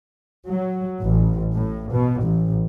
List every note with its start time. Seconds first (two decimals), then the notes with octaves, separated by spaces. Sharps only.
0.49 F#3
1.03 A1
1.54 A2
1.92 B2
2.22 A1